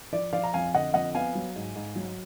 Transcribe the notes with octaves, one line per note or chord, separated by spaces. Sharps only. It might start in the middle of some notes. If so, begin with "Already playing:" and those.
F3 D5
F3 D5 F5
A#5
F2 F5 G#5
D3 D#5 F#5
F2 D#5 F#5
B3 F5 G#5
F#3
G#2
G#2
F#3